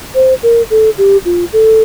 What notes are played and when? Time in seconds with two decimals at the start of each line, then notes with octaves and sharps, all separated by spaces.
0.15 C5
0.43 A#4
0.71 A4
0.98 G4
1.25 F4
1.53 A4